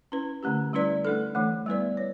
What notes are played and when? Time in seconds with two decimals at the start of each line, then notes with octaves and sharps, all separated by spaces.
0.12 C#4 E4 B4
0.43 D3 A3 C#4 G4
0.73 G3 C#4 E4 B4 D5
1.05 A3 D4 A4
1.35 E3 A3 D4
1.66 G3 B3 E4 B4 D5
1.97 C#5